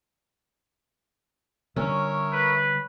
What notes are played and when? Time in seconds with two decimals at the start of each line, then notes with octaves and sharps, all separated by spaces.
1.76 D3 G3 C#4 A#4 C#5 E5
2.32 B4